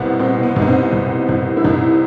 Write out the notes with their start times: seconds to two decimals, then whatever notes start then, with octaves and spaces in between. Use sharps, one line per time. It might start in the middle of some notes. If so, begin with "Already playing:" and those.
Already playing: C2 B2 B3 C4
0.19 B2 C4
0.43 B3
0.56 C2
0.62 D#4
0.68 C4
0.93 C2
1.29 C2
1.57 E4
1.64 C2 D#4